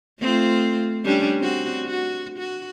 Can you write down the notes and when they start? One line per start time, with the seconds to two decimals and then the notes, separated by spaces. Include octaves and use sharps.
0.20 A3 C4 F4
1.05 G3 C#4 D4
1.40 C4 F#4
1.87 F#4
2.39 F#4